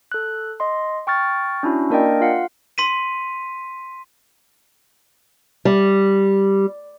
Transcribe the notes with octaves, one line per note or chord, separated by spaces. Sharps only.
A4 F#6
D#5 C6
G5 C#6 F6 A6
C#4 D4 E4 F#4
A#3 D4 A#4 D5 D#5 G5
F4 F5 F#5
C6 B6 D#7
G3